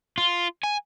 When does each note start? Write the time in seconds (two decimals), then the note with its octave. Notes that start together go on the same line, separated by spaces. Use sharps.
0.18 F4
0.63 G#5